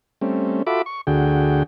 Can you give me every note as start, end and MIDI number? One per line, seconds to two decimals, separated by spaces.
0.21 0.63 55
0.21 0.63 57
0.21 0.63 60
0.21 0.63 61
0.67 0.82 65
0.67 0.82 66
0.67 0.82 69
0.67 0.82 76
0.67 0.82 83
0.67 0.82 86
0.86 1.01 85
1.07 1.63 38
1.07 1.63 50
1.07 1.63 66
1.07 1.63 68
1.07 1.63 79